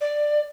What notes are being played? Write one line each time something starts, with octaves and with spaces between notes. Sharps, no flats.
D5